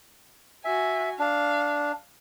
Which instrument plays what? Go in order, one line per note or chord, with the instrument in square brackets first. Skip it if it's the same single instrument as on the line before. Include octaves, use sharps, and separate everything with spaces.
[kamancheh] F#4 G#5 [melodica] E5
[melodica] D4 [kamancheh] F5